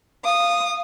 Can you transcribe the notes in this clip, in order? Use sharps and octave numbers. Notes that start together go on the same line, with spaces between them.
F5 D#6